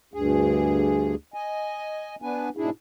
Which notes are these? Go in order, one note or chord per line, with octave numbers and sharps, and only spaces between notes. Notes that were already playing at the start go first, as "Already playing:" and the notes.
D2 G2 G#4
D#5 G#5
B3 D4 B4 G#5
G#2 B2 D4 E4 G#4